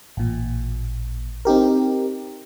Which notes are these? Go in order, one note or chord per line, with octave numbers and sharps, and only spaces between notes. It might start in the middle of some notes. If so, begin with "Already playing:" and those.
A1 A#2
C4 D#4 G4 A#4